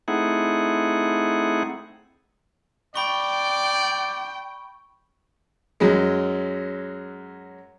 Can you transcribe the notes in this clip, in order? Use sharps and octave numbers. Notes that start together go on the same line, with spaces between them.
A3 C4 D#4 E4 G#4 F#5
D5 G5 B5 C#6
F#2 F#3 G#3